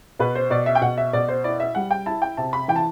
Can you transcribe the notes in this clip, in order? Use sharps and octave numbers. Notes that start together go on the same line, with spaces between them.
B2 B4
C5
B2 D5
E5
G5
B2 F#5
E5
B2 D5
C5
E4 D5
E5
G3 F#5
G5
E4 A5
G5
C3 A5
B5
E3 G5
A5